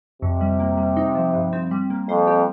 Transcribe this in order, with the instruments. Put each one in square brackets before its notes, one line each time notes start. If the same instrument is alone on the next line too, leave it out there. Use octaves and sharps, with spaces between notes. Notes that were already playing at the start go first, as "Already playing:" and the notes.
[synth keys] F2 [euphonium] C3
[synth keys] G3
A#3
G3
D#4
F3
G2
C4
G3
A#3
[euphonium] F2 [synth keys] C5
[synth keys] G4